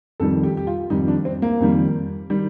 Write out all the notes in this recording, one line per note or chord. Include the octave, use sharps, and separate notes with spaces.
F2 D#3 G3 A4
G4
G4
F4
F2 D#3 G3 D#4
D4
C4
A#3
F2 D#3 G3
D#3 G3